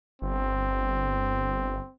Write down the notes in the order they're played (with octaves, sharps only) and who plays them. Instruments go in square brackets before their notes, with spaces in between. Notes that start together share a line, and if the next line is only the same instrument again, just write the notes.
[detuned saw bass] G1 [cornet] C4